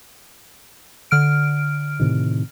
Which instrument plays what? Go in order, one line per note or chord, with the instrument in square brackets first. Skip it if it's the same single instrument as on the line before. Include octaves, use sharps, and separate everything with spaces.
[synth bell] D3 F6 D7
[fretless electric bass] A2 C3 D#3